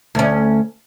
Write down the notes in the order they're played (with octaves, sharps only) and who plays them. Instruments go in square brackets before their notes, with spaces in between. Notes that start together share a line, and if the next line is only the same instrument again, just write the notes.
[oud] D2 C#4